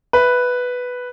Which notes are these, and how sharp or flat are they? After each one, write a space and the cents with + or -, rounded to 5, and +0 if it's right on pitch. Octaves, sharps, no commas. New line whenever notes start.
B4 +0 E5 +0